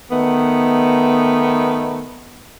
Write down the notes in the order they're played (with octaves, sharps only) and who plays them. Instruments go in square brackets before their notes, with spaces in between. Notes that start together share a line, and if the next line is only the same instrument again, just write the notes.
[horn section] D#3 A3 B3